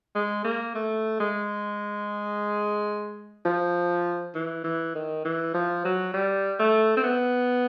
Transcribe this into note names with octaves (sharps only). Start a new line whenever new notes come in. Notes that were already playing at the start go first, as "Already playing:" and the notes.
G#3
A#3
A3
G#3
F3
E3
E3
D#3
E3
F3
F#3
G3
A3
C4
B3